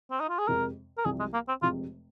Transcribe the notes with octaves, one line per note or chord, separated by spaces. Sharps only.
C4
D#4
F4
G#4
F2 C3 G#3 A#4
A#4
C2 C3 F3 G#4
G#3
A#3
C4
F1 F2 C3 G#3 F4